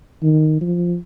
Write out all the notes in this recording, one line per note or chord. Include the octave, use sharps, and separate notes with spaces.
D#3
F3